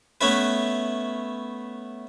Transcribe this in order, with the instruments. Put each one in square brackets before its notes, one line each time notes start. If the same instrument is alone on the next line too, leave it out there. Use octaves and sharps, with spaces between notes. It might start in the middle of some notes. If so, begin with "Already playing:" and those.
[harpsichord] A3 B3 C#4 E4 B4